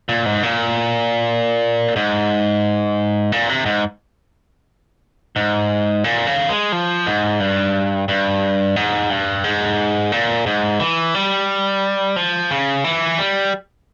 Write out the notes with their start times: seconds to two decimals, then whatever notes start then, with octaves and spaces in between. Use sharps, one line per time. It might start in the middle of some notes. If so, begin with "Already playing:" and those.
0.09 A#2
0.26 G#2
0.43 A#2
1.96 G#2
3.32 A#2
3.49 C3
3.66 G#2
5.36 G#2
6.04 A#2
6.27 C#3
6.49 G#3
6.72 F3
7.07 G#2
7.40 G2
8.08 G2
8.76 G#2
9.10 G2
9.44 G#2
10.12 A#2
10.46 G#2
10.80 E3
11.15 G3
12.16 F3
12.51 C#3
12.84 E3
13.18 G3